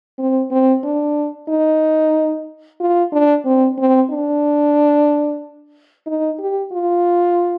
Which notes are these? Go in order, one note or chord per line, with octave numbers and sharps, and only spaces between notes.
C4
C4
D4
D#4
F4
D4
C4
C4
D4
D#4
G4
F4